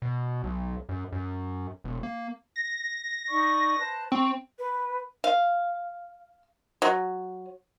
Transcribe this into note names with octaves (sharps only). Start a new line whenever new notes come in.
B2
B1
F#2
F#2
E1
A#3
A#6
D#4 D5 C#6
B4 C5 A5
C4 C#6
B4
F5
F#3